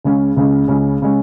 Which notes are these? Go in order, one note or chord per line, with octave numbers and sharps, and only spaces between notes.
C#2 C#3 G#3 C#4
C#2 C#3 G#3 C#4
C#2 C#3 G#3 C#4
C#3 G#3 C#4